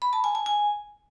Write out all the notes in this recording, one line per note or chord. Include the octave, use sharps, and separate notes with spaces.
B5
A5
G#5
G#5
G#5